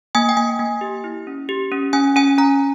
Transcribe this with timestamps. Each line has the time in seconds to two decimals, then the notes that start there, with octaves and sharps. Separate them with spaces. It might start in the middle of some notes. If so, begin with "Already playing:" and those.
0.15 A#3 G#5
0.29 G5
0.37 A#3 G#5
0.59 A#3
0.81 G4
1.04 E4
1.27 C#4
1.49 G4
1.72 C#4
1.93 C#4 G#5
2.16 C#4 G#5
2.38 C#4 A#5